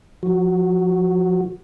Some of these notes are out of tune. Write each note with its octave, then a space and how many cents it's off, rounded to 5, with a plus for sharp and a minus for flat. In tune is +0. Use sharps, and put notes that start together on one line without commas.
F3 +15 F#4 +0